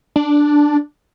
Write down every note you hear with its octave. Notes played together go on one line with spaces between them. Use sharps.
D4